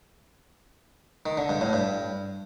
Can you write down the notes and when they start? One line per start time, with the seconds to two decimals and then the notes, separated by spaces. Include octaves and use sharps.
1.26 D#3
1.37 D3
1.49 G2
1.61 A2
1.73 G2